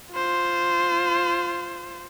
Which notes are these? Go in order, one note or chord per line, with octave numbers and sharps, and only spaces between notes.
F4 C5